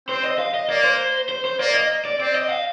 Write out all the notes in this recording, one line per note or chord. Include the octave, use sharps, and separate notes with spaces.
C4 C5
D#5
F5
D#5
A#3 D5
C5
C5
C5
A#3 D5
D#5
D5
C4 D5
D#5
F5